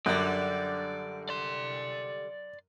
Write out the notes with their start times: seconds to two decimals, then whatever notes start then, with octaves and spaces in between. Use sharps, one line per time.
0.06 F#2 D3 G3 D5
1.29 D5 C6